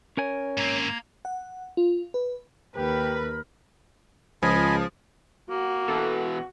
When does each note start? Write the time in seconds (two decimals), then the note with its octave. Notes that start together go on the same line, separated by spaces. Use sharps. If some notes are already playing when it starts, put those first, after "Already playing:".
0.17 C#4 A#4 C#5 G#5
0.58 G#2 A#3 C4 A#5 G#6
1.25 F#5
1.77 F4
2.14 B4
2.76 D#2 G4 A#4 B4 B5
4.43 C#2 F3 G#4 D#5 G#5 B5
5.50 A#3 F#4
5.88 B2 E3 A4